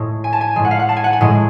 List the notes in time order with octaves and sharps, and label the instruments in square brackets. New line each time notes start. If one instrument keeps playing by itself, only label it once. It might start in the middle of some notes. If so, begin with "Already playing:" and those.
Already playing: [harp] A2 G#3
G#5
A5
G#5
A2 G#3 G#5
F#5
F5
F#5
A5
G#5
F#5
G#5
A2 G#3